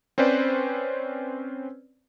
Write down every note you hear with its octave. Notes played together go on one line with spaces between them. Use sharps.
C4 C#4 B4 C5 D5